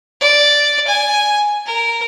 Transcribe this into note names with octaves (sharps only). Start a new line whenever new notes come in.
D5
G#5
A#4